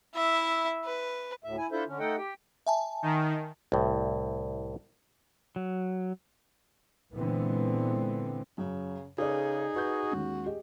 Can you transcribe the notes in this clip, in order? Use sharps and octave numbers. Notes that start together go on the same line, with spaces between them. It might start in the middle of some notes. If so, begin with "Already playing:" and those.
E4 E5
B4
D2 A2 E5
E4 G#5
D4 E4 F4 A4 C5 E5
D3 C#4
A3 D#4 A4 D#5 F#5 G5
G4 G5
E5 G#5 A5
D#3
C2 A2
F#3
A#2 D3 E3 G#3 B3 C4
F#2 C#3
C#3 D#4 G#4 A4 B4 D5
F#4 B4 D#5 G6
D#2 G#3 C#4
G4 G#4 D#5